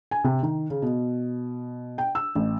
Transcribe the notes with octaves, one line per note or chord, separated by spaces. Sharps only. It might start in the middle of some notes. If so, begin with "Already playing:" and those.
G#5
C3
D#3
C#3
B2
G5
E6
A1